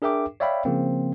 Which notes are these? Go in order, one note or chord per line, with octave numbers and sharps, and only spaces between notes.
D4 G#4 A#4 E5 G5 D6
C#5 D5 E5 F5 G5 B5
C#3 F3 A#3 C4